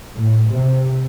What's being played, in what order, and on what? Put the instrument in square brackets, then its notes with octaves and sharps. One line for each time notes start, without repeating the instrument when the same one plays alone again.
[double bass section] A2
C3